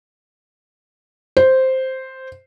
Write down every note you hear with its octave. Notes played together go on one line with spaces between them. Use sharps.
C5